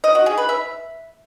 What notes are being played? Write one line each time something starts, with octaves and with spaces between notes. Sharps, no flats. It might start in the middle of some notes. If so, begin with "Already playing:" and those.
D#5
F#4
G#4
B4
E5